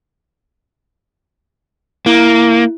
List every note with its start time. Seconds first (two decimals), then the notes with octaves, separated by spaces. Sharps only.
2.06 A#3 E4